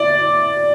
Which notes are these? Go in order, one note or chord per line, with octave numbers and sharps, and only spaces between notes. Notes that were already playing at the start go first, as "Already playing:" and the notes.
Already playing: E4 D5